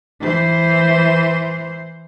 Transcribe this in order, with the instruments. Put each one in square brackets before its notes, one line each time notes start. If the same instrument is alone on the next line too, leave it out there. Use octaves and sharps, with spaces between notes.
[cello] E3 C5